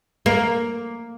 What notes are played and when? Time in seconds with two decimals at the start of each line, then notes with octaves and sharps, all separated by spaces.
0.26 A#3